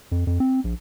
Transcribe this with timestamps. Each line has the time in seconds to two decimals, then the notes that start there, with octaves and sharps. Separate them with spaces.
0.12 F2
0.27 F2
0.40 C4
0.64 A#1